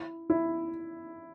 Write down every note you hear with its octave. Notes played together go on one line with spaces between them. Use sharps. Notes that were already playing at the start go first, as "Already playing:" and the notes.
Already playing: E4
E4